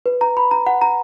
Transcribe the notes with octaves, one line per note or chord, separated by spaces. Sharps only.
B4
A#5
B5
A#5
F#5
A#5